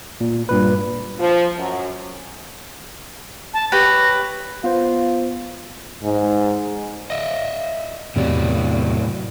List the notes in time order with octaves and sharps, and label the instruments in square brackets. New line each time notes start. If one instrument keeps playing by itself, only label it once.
[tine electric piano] A#2
G2 A#2 B4
[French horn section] F3
F#2
[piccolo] A5
[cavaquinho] G4 B4 C#5 [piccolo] A#6
[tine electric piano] B3 C5 [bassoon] F4
[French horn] G#2
[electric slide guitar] D#5 E5
[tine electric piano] E2 C3 [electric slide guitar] A2 F#3 D5